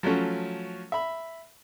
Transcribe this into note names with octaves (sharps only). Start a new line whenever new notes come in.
F3 F#3 A3 C#4
E5 B5